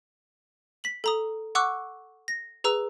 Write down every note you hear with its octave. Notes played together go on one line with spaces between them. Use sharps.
B6 F#7
A4 A#5 D#6
F#5 C#6 D6 E6 F#6
A#6
G#4 B4 A#5 E6